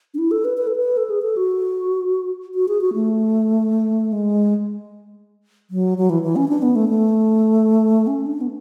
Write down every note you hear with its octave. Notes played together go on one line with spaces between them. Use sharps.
D4
E4
A4
B4
B4
A4
B4
A4
G#4
A4
F#4
F#4
G#4
F#4
A3
G#3
F#3
F#3
E3
E3
C#4
D4
B3
A3
A3
C#4
D4
B3